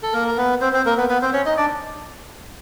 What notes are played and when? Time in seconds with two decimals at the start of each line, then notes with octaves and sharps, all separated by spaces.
0.03 A4
0.13 A#3 A#4
0.28 A#4
0.37 B3 B4
0.61 C4 C5
0.73 C4 C5
0.86 A#3 A#4
0.97 B3 B4
1.09 B3 B4
1.22 C4 C5
1.33 C#4 C#5
1.46 D#4 D#5
1.57 D4 D5